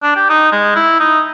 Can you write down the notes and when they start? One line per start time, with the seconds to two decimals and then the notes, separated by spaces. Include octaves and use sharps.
0.03 D4
0.16 G4
0.30 D#4
0.52 G#3
0.76 E4
1.00 D#4